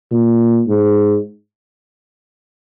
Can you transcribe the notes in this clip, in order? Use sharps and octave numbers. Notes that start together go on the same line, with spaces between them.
A#2
G#2